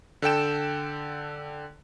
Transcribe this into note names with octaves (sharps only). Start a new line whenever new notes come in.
D3 A4 G5 E7